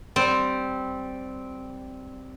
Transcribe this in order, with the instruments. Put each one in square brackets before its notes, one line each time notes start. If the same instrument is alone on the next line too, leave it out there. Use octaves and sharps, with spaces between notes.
[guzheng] G3 C4